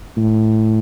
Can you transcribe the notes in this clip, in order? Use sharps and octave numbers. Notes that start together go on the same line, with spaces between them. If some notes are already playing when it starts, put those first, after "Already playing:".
A2